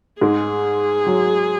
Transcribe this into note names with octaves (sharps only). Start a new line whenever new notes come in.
G#2 G#3 G#4
F#3